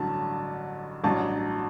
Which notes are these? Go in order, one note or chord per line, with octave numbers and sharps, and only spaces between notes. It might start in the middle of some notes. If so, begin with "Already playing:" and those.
Already playing: A1 G2 D3 F#3 A5
A1 G2 F#3 A5